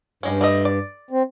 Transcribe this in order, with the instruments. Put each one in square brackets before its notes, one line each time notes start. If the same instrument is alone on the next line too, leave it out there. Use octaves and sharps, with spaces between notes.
[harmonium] G2 [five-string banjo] G3 G#3 C#4
[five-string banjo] G3 A3 D#5
D5
[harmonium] C4